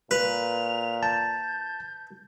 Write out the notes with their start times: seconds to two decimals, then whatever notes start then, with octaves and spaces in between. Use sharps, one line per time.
0.11 A#2 B4 F7
1.03 A5 G6